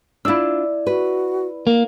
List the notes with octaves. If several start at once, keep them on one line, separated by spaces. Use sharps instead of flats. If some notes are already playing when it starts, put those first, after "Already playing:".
D4 E4 F4 D5 E6
F#4 B4
A#3